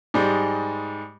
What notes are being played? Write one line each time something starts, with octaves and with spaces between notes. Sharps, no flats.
G#2 G3 G#3